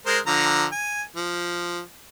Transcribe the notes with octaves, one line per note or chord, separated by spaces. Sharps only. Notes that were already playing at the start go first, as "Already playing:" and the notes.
G#3 A#4 C5
D3 F3 A#5
G#5
F3